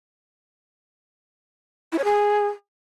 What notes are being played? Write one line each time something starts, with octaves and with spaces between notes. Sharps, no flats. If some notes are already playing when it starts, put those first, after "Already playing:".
E4
C#5
G#4